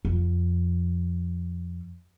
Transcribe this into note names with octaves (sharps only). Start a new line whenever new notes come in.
F2